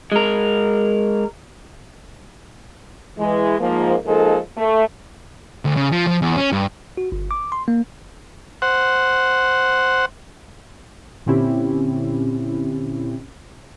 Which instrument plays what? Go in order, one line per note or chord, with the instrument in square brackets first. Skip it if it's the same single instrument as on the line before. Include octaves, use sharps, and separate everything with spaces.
[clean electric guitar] G#3 A#4
[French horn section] E3 G#3
G#2 F3 A#3
F3 G#3 A#3 D#4 A4
A3
[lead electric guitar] D2
C#3
F3
F3
E2
C#4
G2
[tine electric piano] F#4
G1
D6
C6
A#3
[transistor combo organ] C5 F#5
[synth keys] A#2 D3 C4 C#4 E4 G4